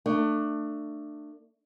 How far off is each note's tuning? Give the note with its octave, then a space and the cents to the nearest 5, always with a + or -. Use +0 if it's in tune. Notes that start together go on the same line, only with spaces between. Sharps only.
A3 +25 D4 +30